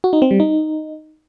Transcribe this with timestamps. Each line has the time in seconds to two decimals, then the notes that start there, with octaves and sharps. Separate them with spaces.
0.04 F#4
0.13 D#4
0.22 C4
0.31 G3
0.40 D#4